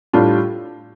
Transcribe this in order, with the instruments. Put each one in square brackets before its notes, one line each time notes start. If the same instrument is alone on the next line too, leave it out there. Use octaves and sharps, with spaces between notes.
[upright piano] A2 G3 D4 F4